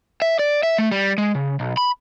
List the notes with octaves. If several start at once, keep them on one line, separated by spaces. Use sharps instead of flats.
E5
D5
E5
A3
G3
G#3
C#3
B1
B5